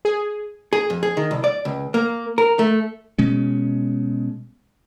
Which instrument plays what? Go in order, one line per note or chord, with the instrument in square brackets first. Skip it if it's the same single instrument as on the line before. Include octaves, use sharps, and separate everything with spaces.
[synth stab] G#4
[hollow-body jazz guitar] G#4
F2
G#4
D#3
C2
D5
C#2
A#3
A#4
A3
[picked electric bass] B2 G#3 C#4